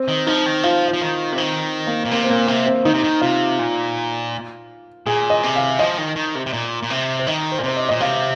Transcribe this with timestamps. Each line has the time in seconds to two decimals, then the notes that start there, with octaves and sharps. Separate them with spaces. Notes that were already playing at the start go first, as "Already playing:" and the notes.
Already playing: C4
0.08 D#3
0.27 F3 D#4
0.46 D#3
0.63 F3 F4
0.88 F4
0.93 F3
1.01 D#3
1.32 C3
1.37 D#3 C4
1.87 A#3
2.05 A#2
2.11 C3 A#3
2.24 C4
2.30 A#2 A#3
2.48 C3 A#3
2.66 C4
2.85 D#3 D#4
2.94 C3
3.04 D#3
3.21 C3 F4
3.59 A#2
5.07 A#2 G#4
5.30 D#5
5.43 C3
5.56 F5
5.79 F3 D#5
5.98 D#3
6.16 D#3
6.35 C3
6.46 C3
6.53 A#2
6.83 A#2
6.90 C3
7.19 C5
7.27 D#3 D#5
7.52 C5
7.59 A#2
7.64 C3 C5
7.77 D#5
7.89 A#2 D#5
8.00 C3 F5